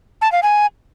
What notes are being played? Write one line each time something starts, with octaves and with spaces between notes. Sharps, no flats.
A5
F5
G#5